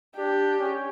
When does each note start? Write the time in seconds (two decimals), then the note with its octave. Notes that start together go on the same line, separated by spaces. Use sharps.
0.17 D4 G4
0.59 C#4